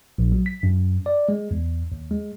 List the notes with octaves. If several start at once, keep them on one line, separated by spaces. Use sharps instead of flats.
A#1
F#3
B6
F#2
D5
G#3
E2
D#2
G#3